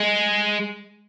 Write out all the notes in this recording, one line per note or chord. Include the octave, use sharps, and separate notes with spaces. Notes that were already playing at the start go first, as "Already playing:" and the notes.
Already playing: G#3